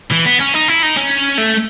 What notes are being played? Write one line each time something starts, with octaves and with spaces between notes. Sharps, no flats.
E3
B3
C#4
D#4
E4
D#4
C#4
A3